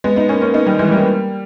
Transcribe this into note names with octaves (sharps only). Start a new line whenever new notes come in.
G#3 B3
B3 D#4
A#3 C#4
A#3 C#4
B3 D#4
D#3 G3
E3 G#3
G3 A#3